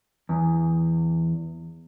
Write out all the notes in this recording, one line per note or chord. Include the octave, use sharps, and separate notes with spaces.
E2